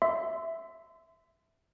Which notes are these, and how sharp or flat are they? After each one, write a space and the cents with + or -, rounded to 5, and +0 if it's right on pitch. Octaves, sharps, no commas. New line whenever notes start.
E5 +0 C6 -30